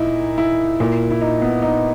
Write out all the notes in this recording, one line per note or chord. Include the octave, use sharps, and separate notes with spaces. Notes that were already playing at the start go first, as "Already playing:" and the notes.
Already playing: A#2 D#4 E4
E4
A#2
E4
D#4
B3
D#4